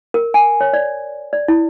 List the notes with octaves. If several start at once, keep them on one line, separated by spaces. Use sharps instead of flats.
A#4
G#5
C#5
D5
D5
E4